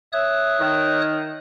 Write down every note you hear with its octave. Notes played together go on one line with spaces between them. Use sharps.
C#5 E5 D#6 F#6
D#3